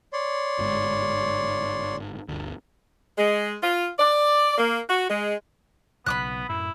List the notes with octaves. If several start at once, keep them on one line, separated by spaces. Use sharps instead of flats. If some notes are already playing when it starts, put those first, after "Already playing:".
C#5 D5 C6
G1 G#2
G1 D2
G#3
F4
D5
A#3
F#4
G#3
B1 C#3 B3 B5 D6 F#6
F#2 A2 E4